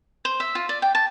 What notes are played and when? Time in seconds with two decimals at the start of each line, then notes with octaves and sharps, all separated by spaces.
0.25 C5
0.40 E5
0.55 F4
0.69 D5
0.82 G5
0.95 A5